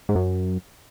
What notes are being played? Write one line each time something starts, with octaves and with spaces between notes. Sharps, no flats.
G#2
F#2